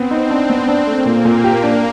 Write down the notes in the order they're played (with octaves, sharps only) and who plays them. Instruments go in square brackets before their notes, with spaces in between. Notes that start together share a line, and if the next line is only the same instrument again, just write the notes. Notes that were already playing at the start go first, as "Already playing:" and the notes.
Already playing: [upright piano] B3 [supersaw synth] C4
[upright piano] D#4
D4
B3
D4
[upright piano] A3 [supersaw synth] A#3
[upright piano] A#2
A#2
G4
D4